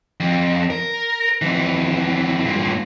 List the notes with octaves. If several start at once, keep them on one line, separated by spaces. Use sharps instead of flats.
F2
A#4
F2 E3
G2 A#2